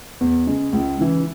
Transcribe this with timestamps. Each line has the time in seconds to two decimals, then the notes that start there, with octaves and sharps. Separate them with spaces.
0.20 E2
0.47 C#3 G#3
0.73 C#2
0.99 C#3 E3